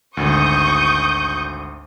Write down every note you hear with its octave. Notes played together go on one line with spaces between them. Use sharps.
G#1 D2 C#6 D#6 G6